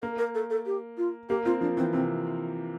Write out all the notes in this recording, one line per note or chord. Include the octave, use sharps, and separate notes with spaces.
A#3 A#4
A#4
A4
A4
G4
F4
A#3 G4
C4 F4
F3 D4
E3 C4
C3 C4